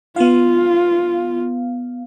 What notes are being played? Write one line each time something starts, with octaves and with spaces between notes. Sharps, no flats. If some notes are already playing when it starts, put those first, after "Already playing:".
B3 F4 F5